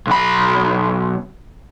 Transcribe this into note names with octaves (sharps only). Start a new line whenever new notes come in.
B1 B5